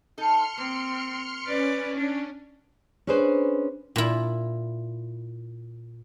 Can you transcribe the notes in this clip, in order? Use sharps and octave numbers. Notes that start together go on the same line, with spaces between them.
D#4 A4 C6 F6 C#7
A#3 C4
C#4 B4 D5
D4
C#4 D4 G#4 B4 C5
A#2 E4